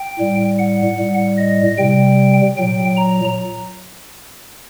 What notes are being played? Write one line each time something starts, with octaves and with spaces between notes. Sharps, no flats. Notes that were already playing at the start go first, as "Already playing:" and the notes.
Already playing: G5
A2 G3
F#5
A2 G3
D#5
C3 G3 G5
A#2 F#3 G5
A#5